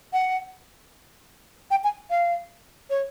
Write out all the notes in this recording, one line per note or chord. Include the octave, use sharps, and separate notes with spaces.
F#5
G5
G#5
F5
C#5